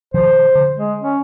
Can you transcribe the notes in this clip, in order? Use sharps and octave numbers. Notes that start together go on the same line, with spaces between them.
B2 D#3 F3 C5
D3
G#3
C#4